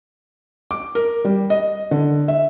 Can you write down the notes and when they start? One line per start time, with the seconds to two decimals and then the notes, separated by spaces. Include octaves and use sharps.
0.71 D6
0.95 A#4
1.25 G3
1.50 D#5
1.91 D3
2.28 E5